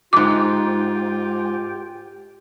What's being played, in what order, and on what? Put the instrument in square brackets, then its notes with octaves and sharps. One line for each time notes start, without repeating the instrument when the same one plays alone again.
[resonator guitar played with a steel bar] F2 G#2 [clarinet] F4 [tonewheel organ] G4 [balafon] D6